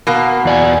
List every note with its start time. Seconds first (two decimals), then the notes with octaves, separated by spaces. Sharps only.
0.07 B2 A#3
0.45 E2 D5 G#5